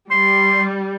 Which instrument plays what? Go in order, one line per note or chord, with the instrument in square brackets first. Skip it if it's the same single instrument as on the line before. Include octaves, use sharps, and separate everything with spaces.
[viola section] G3 [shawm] C6